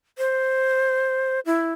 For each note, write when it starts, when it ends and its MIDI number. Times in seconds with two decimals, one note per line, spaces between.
0.18 1.40 72
1.46 1.73 64